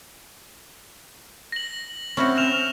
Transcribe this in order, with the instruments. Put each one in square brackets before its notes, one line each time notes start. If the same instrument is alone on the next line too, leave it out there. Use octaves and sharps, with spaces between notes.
[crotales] A#6 F#7
[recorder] C4 [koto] C#4 E4 F#4
[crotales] F6 E7 F7